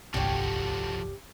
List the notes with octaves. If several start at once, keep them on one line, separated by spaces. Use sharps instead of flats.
D1 G1 C2 F3 F#4 G4 A4 C#5